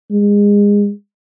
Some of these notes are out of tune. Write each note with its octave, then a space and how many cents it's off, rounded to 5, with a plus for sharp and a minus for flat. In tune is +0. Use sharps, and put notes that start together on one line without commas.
G#3 -25